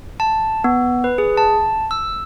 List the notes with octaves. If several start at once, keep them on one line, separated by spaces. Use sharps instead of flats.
A5
B3
B4
G#4
A5
E6